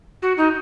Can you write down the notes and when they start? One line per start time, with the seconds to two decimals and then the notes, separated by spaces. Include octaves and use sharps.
0.22 F#4
0.37 D#4